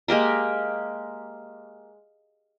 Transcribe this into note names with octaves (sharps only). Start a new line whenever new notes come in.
G#3 A#3 G4 A#4